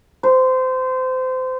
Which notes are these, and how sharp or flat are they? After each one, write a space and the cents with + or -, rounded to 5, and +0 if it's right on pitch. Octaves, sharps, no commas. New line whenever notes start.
C5 -25